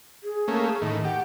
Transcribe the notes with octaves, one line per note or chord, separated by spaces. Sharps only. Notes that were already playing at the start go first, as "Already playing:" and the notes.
G#4
A3 A#3 C#4
A2 D#3
G4 F#5